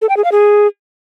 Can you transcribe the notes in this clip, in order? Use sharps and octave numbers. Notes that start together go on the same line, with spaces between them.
A4
G5
G#4
F5
G#4